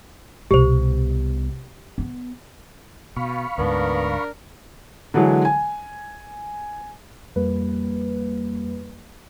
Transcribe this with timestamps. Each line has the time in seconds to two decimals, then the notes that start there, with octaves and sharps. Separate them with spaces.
0.51 C2 B2 G4 C5
1.98 B3
3.16 B2 F5 B5 C#6
3.58 D2 G#2 B3 D4 A#4
5.14 D3 E3 F#3 G#3
5.45 G#5
7.36 F2 G3 A#3 B4